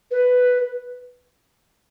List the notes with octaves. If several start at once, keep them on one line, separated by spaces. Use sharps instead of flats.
B4